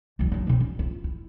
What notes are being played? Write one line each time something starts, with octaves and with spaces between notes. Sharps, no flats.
D#2 F#3
F#3 D4
B2 C4
C#4
F4
E4